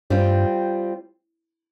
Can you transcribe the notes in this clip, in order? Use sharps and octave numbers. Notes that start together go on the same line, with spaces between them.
G2 G3 C4 F4